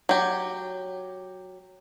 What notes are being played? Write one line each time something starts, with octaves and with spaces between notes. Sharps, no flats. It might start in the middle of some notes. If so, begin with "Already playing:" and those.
F#3 G4